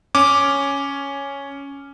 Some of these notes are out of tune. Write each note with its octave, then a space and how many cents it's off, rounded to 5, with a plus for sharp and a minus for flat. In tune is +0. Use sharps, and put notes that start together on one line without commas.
C#4 +0 D6 +0